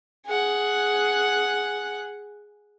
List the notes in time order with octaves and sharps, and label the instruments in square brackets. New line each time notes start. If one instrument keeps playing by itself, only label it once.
[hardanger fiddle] G#4 F#5